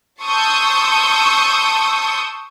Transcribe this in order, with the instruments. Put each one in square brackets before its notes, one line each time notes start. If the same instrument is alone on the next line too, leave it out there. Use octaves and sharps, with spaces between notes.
[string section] A5 C6 C#6 D#6 E6 G6